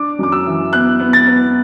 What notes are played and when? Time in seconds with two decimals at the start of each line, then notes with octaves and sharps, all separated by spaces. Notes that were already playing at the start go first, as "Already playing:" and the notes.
Already playing: D4 D6
0.19 F#2 D6
0.32 E6
0.46 E3
0.73 B3 F#6
1.00 B3
1.13 A6
1.27 B3